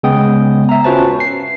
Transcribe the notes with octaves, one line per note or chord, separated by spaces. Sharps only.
C#3 G#3 B3 G5 D#6
E5 A#5
C#4 F4 F#4 B4 C5 A5
B4 C7